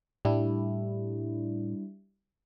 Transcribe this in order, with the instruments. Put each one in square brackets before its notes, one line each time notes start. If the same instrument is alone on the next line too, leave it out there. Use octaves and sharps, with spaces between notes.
[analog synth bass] A2 [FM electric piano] G3 D4 E4